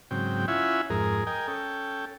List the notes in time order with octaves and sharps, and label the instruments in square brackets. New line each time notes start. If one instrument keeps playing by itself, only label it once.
[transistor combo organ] G#2 C#3 F#3 C4 G5
C#4 E4 F4 E5 F#5 G#5
F2 G#2 G#4 A#4
A#4 D#5 G5 G#5
C#4 A4 G5